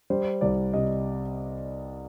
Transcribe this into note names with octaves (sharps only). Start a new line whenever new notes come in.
G3 C5
C2 D5
C3 D#5